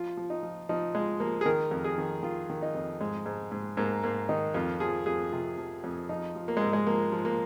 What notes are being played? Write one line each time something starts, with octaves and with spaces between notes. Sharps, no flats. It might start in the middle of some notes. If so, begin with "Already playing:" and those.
Already playing: F3 F4
F3
D#4
F3
F3 D#4
F3 G#3
F3 A#3
G#4
D#3 A#4
F2
G#4
D#3
D#3 F4
D#3
D#4
F2
G#2 G#3
G#2
G#2
G#2 A#3
G#2 A#3
D#3 D#4
F2 F4
F3 G#4
F2 G#4
C3 F4
F3
F2
F3 D#4
F3
A#3
G#3
G#2
G#3
F3 A#3
F3
A#3